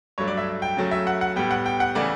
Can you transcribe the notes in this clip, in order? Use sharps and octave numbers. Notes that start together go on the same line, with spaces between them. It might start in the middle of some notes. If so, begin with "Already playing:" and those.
G2 F#3 A3 C#5
D5
E5
G5
C#3 F#3 A3
E5
F#5
F#5
A2 G3 B3 G5
F#5
G5
F#5
C#3 E3 A3 D5